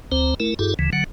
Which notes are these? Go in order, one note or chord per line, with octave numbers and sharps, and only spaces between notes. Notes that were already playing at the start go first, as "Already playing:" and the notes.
D2 C4 C5 A#5
A3 E4 A#4
G2 E4 F#4 G#4 A4
D2 C#3 E3
D3 F#3 F#5